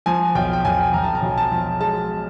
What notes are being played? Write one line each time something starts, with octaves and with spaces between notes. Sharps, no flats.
F3 G#5
B1 G5
G5
B1 G#5
B1 A#5
A5
A#5
B1
A5
F3
G#3 A5